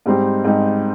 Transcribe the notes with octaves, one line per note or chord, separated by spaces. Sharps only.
G#2 G3 C4 D#4 G4
G#2 G3 C4 D#4 G4